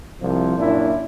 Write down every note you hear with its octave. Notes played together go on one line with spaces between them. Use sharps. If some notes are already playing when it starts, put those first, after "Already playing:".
C2 F3
F#2 A#2 D4 E4